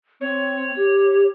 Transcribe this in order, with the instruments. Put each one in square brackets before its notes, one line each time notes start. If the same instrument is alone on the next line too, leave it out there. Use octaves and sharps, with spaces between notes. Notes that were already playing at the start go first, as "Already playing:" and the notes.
[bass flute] C4 [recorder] C#5
[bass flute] G4